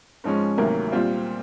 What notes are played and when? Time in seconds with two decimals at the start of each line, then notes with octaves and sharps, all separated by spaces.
0.24 G#2 F3 G#3 C#4
0.58 D2 C3 D#3 F#3 A#3
0.92 A#2 G3 C4 F4